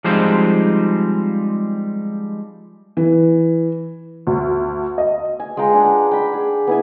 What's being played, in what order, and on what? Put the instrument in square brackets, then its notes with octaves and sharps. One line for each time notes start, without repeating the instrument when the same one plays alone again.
[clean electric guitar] F3 G3 G#3 C4 D#4 C5
[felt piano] E3
[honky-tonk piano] D2
D#5
[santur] G#5
G#3 F4 G5 A#5
D4 G#4 F#5
G5 B5
G#4
B3 E4 G#5